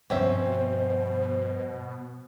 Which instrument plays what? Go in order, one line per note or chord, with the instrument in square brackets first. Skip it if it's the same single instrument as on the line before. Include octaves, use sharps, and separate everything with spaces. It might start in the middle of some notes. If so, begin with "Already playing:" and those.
[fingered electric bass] G2 F3 G3 [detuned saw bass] B2 [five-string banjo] C4 C#4 E5 [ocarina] C5